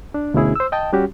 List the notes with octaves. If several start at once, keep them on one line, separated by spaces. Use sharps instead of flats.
D4
D2 B2 C#4 E4 G#4
C5 E6
D#5 G5 A5
G3 C#4 F#4 G4